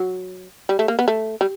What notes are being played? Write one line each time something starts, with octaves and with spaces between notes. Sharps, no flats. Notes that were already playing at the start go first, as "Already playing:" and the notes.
Already playing: F#3
G3
A3
A#3
B3
A3
G3